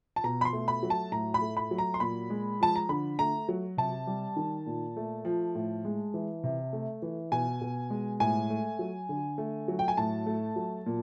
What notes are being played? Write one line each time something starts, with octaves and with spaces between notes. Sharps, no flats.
A5
B2 A#5
B5
C6
A3
B5
F#3
A5
A2 A#5
B5
A3
B5
F#3
A#5
C6
A#2 B5
G#3
F3 A5
A#5
D3 B5
A3 A#5
F#3
C3 A5
G3
D#3
A#2
A3
F3
A2
G#3
E3
C3
A3
E3
B2 G#5
B2
G#3
A2 G#5
A3
F#3
D3
A3
F#3
G5
G#5
A2 A5
A3
F#3
A#2